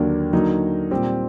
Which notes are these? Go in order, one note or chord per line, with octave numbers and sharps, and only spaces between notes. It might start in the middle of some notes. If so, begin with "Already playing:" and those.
Already playing: D#2 D3 F#3 A#3 D4
D3 F#3 A#3 D#4
A#2 G3 C4 G4